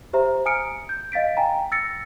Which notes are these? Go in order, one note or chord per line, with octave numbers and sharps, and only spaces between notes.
G4 C5 E5 A#5
G#5 A#5 D#6 F6 C#7 D7
G6
D#5 F5 A6 B6 D7
F5 G5 G#5 A#5
E6 A6 A#6 C#7